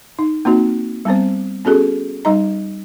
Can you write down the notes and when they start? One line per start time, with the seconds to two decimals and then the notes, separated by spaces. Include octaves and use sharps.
0.19 D#4
0.45 A#3 C4 D#4 F#4
1.05 G3 B3 C4 C5
1.65 B3 C#4 F#4 G#4 A4
2.25 G3 D#4 D#5 A#5